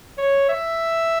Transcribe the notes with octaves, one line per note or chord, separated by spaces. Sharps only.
C#5
E5